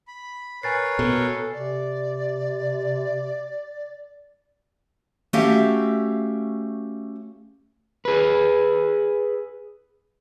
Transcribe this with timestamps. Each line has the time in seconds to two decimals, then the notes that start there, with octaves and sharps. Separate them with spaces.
0.07 B5
0.63 A#4 B4 C#5 G#5 A6 C7
0.99 B2 A4
1.54 C3 D5
5.33 A3 C#4 F#4 G4 E5 F5
8.05 G#4 B4